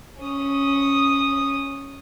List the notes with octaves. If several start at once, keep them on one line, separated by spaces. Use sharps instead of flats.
C#4 D#6